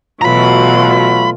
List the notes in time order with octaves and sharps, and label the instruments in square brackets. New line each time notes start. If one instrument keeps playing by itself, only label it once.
[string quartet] B2 E3 [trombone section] F#3 A3 F4 [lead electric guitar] A#5 B5